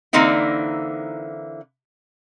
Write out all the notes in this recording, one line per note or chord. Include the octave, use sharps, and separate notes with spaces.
D3 E3 A#3 C4 D#4 E4